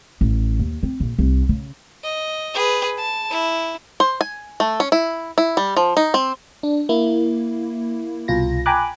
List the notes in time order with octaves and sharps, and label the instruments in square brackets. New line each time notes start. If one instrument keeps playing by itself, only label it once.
[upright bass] A1
D#2
C4
A#1
C2
C#3
[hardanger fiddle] D#5
G#4 B4
A5
E4
[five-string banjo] C5
G#5
A3
C#4
E4
E4
G3
F3
D#4
C4
[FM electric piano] D4
A#3 E4
C2 B2 F4 A#6
G5 G#5 A#5 B5 D6 F#6